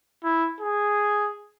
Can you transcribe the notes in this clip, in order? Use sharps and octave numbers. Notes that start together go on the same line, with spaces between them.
E4
G#4